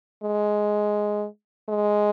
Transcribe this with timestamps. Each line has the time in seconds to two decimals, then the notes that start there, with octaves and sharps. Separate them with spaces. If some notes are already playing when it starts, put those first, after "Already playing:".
0.23 G#3
1.69 G#3